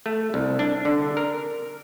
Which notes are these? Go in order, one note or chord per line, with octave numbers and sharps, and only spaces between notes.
A3
C2
D4
D3
A#4